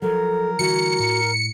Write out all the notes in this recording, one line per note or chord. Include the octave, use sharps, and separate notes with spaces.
F3 F#3 A4 A#4
D3 E3 G3 F#4 C#7
A2